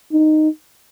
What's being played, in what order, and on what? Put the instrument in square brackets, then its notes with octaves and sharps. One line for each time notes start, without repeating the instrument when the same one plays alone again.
[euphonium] D#4